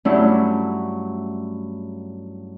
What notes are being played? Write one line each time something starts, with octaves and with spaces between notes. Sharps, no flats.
G2 F#3 A3 C#4 D4 E4